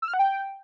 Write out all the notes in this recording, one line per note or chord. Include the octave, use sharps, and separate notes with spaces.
E6
F6
F#5
G5